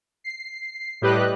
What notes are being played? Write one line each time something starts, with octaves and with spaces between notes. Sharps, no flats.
C7
A2 G3 G4 B4 D#5 F#6